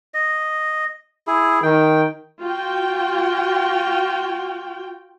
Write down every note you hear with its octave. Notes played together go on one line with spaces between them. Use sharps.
D#5
E4 G#4
D#3 G5
F4 F#4 G5